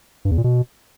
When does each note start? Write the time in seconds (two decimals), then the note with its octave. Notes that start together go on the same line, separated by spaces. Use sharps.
0.25 G2
0.31 E2
0.38 A#2
0.44 B2